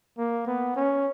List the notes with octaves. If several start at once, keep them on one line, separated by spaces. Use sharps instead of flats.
A#3
B3
C#4